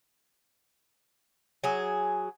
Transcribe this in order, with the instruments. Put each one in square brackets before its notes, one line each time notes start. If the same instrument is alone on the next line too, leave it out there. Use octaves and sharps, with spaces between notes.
[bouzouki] F#3 G#4